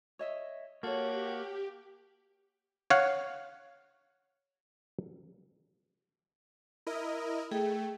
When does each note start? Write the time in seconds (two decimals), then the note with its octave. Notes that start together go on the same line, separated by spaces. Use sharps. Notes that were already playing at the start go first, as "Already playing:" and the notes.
0.19 C#5 D#5 E5
0.83 A#3 F#4 G4 A4 C#5
2.90 C#5 F5 F#5
6.87 E4 A#4 D#5
7.51 A3 G#4 G5